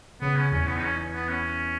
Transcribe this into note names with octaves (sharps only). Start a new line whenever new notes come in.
C#3 B3
C#4
E2 C#4
B3
D#4
C#4
B3
C#4